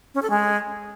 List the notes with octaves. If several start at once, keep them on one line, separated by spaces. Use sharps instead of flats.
C#4
A4
G#3